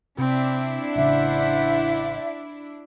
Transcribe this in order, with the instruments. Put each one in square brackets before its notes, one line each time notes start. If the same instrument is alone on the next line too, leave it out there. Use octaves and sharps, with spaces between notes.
[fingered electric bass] C3 [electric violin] C4 [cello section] D4 E4
[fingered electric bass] A1 A2 C#3 [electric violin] C5 F#5 [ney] E5